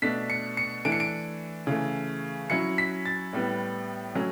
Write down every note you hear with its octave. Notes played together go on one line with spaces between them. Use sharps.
B2 A3 D4 B6
C#7
C#7
E3 A3 D4 D7
C#7
D7
C#3 E3 A3
F#3 C#4 E4 C#7
B6
A6
A2 G3 B3
F#3 A3 C#4